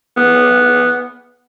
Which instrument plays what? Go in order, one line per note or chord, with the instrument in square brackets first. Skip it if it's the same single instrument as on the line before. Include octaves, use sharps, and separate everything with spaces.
[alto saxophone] B3